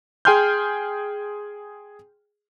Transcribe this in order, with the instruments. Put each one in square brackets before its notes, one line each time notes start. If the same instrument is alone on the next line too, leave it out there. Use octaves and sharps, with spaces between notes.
[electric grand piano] G#4 G5 G#5 C6 F6 G6